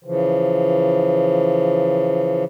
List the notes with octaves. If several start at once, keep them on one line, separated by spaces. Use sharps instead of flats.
C#3 E3 F3